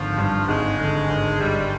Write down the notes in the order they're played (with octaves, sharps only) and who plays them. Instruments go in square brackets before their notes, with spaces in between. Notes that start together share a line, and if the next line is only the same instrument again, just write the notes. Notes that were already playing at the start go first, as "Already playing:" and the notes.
Already playing: [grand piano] G#1 D3 [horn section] F3
[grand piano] G2
[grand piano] G#1 [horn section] G#3
[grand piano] D3
G#1
[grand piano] G2 [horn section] G3